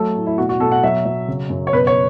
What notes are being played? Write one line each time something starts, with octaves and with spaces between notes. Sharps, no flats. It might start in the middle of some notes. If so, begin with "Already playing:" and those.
Already playing: F#3 A3 A4
A2
E4
B2 F#4
F#4
B2 A4
F#5
F#3 E5
F#3
C#3
F#2
C#5
B2 B4
C#5